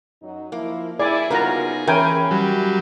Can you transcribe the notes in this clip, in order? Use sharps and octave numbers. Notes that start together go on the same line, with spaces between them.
F#2 F#3 D#4
F3 A#3 E4
E4 G#4 D5 G#5
C#3 G3 B3 D#4 F4 F#4 A#4 A#5
E3 C#4 A#4 G5 G#5
F#3 G3